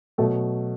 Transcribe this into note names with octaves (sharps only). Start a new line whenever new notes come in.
B2 F#3 A3 A4